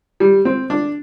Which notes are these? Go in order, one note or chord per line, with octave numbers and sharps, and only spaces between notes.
G3
C4
D4